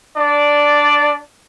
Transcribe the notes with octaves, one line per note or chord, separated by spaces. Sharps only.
D4 D5